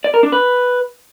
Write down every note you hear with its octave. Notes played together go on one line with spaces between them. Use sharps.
D5
A#4
D4
B4